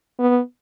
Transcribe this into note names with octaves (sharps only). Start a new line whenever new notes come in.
B3